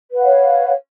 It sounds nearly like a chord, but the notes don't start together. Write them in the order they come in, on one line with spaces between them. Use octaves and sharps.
B4 F#5 F5 C#5